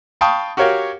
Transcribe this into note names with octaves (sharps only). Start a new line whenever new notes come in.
F5 G5 A5 B5 C#6 D#6
F#4 G4 A#4 C#5 F5 G5